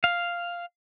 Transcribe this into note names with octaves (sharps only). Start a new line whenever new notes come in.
F5